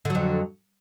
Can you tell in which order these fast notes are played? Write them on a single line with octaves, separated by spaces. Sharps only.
D3 F#3 F2